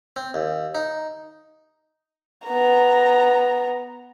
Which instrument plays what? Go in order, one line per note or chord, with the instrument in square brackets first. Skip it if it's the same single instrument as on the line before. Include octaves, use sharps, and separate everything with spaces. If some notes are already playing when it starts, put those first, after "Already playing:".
[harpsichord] C4
D#2
D#4
[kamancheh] B3 A#5